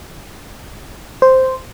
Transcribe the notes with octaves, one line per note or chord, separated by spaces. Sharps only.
C5